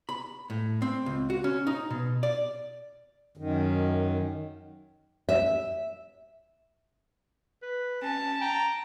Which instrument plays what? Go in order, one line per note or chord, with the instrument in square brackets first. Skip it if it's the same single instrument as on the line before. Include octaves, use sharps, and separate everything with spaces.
[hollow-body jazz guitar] B5
A2
C4
C#2
F#4
C#4
D#4
B2
D5
[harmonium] F#2 D#3
[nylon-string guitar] E5
[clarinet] B4
[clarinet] C#4 [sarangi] A5
[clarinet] G5 [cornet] A#5